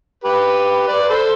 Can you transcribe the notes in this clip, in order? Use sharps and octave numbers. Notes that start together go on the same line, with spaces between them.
G4 B4
B4 D5
B4
A4 C5